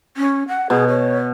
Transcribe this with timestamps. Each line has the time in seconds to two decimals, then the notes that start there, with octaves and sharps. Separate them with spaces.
0.17 C#4
0.48 F#5
0.70 B2 G#4
0.88 C#5